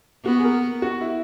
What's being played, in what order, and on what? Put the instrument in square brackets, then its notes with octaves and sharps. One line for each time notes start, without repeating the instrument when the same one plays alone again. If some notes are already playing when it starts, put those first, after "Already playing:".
[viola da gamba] B3 [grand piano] F#4
[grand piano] G#4
A#4
F#4
E4